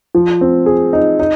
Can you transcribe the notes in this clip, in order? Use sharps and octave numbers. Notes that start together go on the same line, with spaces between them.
F3
C4
G#4
D#4
D#4